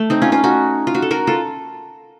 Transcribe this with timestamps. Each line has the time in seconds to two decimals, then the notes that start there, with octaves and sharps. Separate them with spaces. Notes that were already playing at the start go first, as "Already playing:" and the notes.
Already playing: A3
0.10 C4 D#4
0.22 C#4 F4
0.32 C#4 F4
0.44 D#4 F#4
0.87 F4
0.95 F#4
1.02 A4
1.11 F#4 A#4
1.27 F4 A4